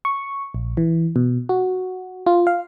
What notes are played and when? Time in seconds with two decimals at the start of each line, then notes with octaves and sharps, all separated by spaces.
0.05 C#6
0.54 A#1
0.77 E3
1.16 B2
1.49 F#4
2.26 F4
2.47 F5